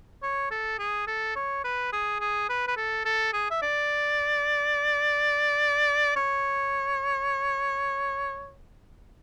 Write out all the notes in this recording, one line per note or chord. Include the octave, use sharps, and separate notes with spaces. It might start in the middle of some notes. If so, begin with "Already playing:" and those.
C#5
A4
G#4
A4
C#5
B4
G#4
G#4
B4
B4
A4
A4
G#4
E5
D5
C#5